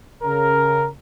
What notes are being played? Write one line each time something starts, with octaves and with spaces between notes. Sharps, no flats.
C#3 A#4